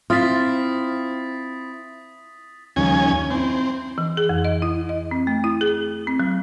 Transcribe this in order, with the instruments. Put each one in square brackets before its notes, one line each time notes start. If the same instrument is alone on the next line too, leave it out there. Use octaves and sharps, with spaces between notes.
[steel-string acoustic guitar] C4 E4 [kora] F4 [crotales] D#6 A6 B6
[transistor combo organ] D#2 C#4 G#5 [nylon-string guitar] C#3 F3 G3
[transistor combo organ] C4 [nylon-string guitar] D#4 E4
[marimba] E3
G#4
F2
D#5
E4
D#5
C4
A3
E4
G#4
C4
F#3